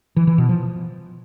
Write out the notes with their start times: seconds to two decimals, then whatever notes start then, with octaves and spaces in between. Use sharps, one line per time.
0.16 E3
0.27 E3
0.38 B2
0.49 F3